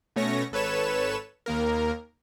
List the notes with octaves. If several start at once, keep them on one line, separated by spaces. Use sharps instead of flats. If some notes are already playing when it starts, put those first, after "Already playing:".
B2 A3 C#4 C#5 C#6 A#6
G#1 A4 B4 C#5 E7
D#2 A#3 A#4